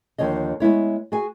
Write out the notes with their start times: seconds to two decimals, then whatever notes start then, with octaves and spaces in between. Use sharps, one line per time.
0.18 D#2 D3 F3 C#5 D#5
0.60 G#3 B3 E4 C#5
1.12 F#4 G#4 G#5